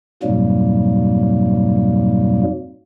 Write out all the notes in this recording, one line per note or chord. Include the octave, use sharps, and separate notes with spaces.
F2 G#2 B2 F#3 G3 A#3